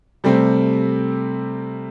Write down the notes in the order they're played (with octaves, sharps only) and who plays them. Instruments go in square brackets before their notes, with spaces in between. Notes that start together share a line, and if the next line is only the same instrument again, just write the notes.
[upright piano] C3 G3 A3 C4